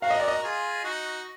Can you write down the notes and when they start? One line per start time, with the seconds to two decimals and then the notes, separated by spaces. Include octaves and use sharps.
0.02 F#4 A#4 F5
0.10 D#5
0.20 D5
0.28 D#5
0.44 F4 G#4
0.84 D#4 F#4